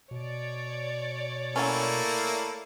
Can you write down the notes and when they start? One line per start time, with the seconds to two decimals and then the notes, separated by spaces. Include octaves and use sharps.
0.11 B2 C#5 D5
1.56 F#3 A3 A#3 C#4 E4